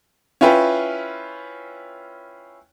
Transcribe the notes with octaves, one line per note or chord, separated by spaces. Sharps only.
C#4 E4 F4 B4 G5